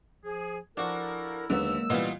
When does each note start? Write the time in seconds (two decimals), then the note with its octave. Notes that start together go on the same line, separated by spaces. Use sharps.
0.24 F3 G#4
0.77 F3 D4 E4 F#4 A4 A#4 C#6
1.50 D#2 D3 F#3 G#3 A#3 B3 E6
1.90 A#2 E3 G3 B3 F4 D#5